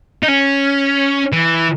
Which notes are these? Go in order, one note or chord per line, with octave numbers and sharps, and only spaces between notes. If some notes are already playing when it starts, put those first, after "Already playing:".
D#4
C#4
E3